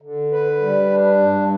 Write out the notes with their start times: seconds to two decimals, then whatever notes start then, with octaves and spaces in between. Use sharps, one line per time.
0.02 D3
0.32 B4
0.60 G3
0.90 D4
1.19 G2